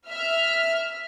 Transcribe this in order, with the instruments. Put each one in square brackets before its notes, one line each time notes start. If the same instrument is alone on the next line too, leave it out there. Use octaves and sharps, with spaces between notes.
[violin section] E5 F6